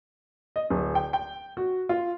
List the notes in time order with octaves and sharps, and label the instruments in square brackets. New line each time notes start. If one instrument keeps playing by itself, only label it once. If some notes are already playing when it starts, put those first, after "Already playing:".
[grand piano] D#5
D1
G5
G5
F#4
F4